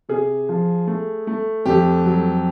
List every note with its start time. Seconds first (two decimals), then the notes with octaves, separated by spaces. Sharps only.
0.09 C3 G#4
0.49 F3
0.87 A3
1.27 A3
1.66 F2 G4
2.05 F#3